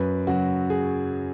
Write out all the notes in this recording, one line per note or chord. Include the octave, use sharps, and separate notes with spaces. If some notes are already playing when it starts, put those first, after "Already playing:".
Already playing: F#2 B4
C#3 F#3 F#4
G#4